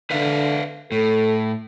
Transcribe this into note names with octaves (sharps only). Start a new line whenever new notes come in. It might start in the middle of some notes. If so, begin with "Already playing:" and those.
D3 B4 E5 F5
A2 A4